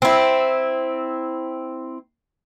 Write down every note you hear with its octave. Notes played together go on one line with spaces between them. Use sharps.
C4 E4